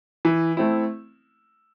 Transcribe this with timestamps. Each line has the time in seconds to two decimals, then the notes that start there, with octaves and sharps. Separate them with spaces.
0.25 E3
0.57 A3 C4 E4